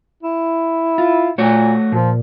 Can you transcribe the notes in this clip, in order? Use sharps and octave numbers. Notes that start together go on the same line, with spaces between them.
E4
F4
A#2 A3 F#4 C#5
A#2 F3